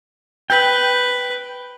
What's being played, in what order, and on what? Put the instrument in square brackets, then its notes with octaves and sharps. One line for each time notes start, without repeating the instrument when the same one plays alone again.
[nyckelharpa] B4 [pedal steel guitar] G5